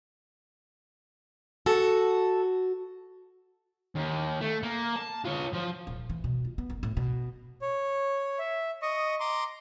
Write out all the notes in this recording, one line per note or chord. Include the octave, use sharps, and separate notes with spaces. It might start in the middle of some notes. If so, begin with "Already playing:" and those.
F#4 A4
D#2
A3
A#3
A5
F4 C#5
F3
D#1
E3
B2
F4
B3
F#1
A2
B2
C#5
E5
D#5 C#6 D#6
A#5 C6 D6